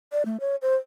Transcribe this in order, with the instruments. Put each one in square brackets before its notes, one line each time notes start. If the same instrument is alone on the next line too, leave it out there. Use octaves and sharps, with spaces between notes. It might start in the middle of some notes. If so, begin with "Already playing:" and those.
[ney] D5
A3
C#5
C5